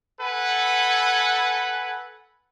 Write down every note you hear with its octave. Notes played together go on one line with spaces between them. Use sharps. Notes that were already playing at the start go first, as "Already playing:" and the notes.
A4 B4 F#5 G#5